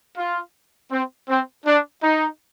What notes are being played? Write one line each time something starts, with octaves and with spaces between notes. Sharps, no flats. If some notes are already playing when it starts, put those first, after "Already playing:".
F4
C4
C4
D4
D#4